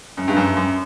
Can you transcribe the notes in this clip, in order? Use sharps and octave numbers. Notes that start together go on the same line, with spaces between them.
F#2
G2
F#2
F#2